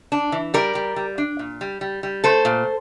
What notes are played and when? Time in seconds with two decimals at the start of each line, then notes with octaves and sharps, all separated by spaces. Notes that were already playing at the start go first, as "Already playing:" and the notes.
0.12 D4
0.32 E3
0.54 G3 A#4 D5
0.75 G3
0.96 G3
1.18 D4
1.39 A#2
1.61 G3
1.81 G3
2.03 G3
2.24 A3 A4 C5
2.45 A#2